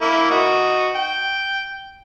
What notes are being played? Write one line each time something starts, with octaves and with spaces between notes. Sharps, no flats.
A#3 E4
D#4 F#4
G5